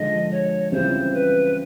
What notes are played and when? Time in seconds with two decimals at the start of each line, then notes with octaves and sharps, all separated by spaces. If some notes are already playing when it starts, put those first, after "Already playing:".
Already playing: D3 F3 G#3 D#5
0.31 C#5
0.72 C#3 E3 G3 C4 F4 C5
1.13 B4